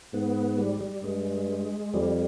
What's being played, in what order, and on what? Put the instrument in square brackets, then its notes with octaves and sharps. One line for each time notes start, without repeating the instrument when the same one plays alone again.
[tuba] G#2 [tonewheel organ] B3
[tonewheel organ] G3
G3
[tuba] G2 [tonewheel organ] G#3
[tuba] F2 [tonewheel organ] G3